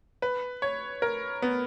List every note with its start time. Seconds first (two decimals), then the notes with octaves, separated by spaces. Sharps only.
0.22 B4
0.62 C#5
1.02 A#4
1.42 B3